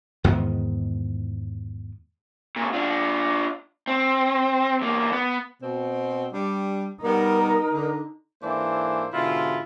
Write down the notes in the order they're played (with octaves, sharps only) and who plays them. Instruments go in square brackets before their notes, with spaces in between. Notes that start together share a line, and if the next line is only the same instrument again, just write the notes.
[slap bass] E2 G#2 D#3 B3
[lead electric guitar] A#2 C#3
D4 F4
C4
E2 A#3
B3
[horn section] B2 C4
G3 D4
[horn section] G3 B3 [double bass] D#4 [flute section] A#4
[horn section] D3
G#2 E3 A#3 D4 A4 C5
G#2 B2 D3 E4 F4